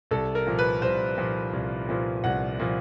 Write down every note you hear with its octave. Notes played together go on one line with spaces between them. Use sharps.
C2 A4
A#4
A#2 F3
B4
C2 C5
A#2 F3
C2
A#2 F3
C2 F#5
A#2 F3